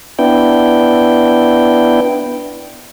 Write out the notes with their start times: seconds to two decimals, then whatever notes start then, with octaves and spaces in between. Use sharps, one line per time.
0.19 B3 D4 E4 G5